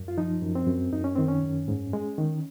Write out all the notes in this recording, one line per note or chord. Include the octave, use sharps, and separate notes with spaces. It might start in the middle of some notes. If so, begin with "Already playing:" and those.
Already playing: F#2
F4
F3 D#4
F#2
C4
F#2
F#2 D#4
C#4
D#3 C4
C#4
F#2
G#2
G#3
D#3